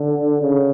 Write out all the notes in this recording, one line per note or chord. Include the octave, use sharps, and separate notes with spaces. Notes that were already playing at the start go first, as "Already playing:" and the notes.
Already playing: D3
C#3